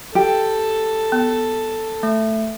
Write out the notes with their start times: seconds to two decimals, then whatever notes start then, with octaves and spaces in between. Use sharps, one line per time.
0.15 G4 A4
1.12 B3
2.03 A3